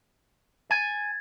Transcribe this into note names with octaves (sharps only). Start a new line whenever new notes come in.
G#5 G#6 A6